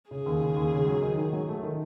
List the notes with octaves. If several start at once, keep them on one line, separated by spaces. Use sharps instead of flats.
C#3 G#4
D#2
C#3
D#2
C#3
F#3
D#3
D#3
F#3
A3
D#3